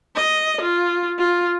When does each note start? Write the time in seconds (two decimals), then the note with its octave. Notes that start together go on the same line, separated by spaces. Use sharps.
0.16 D#5
0.62 F4
1.18 F4